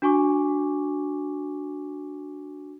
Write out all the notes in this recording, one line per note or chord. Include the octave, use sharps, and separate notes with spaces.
D4 F#4 G#5 C#6 D6